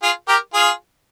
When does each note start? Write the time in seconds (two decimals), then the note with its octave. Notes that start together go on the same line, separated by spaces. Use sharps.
0.03 F4 G#4
0.28 G4 A#4
0.54 F4 G#4